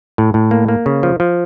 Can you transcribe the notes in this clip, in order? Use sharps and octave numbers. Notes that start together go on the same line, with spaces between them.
A2
A2
A#3
A#3
C#3
F3
F3